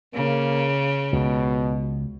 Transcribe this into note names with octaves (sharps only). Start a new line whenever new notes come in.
C#3 A#3
C#2 B2